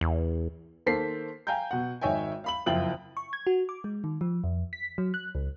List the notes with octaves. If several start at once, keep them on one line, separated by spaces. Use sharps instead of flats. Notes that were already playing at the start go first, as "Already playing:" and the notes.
E2
D#3 A#3 A4 C5 B6 C7
F5 G5 G#5 A#5 G6
B2 F#5
G#1 D#4 C#5 E5 G5 G#5
F5 B5 F#7
F#1 F2 E4 F4 G5 F#7
C#6
G#6
F#4
D6
G#3
D#3
F3
F2
B6
F#3
F#6
C#2